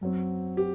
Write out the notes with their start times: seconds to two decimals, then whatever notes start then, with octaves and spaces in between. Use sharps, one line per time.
0.01 F#2 F#3 C4
0.57 G4